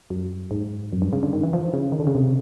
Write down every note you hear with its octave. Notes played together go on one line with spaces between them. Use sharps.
F#2
G#2
F#2
G2
C#3
D3
D#3
E3
F3
C#3
D#3
D3
C#3
C3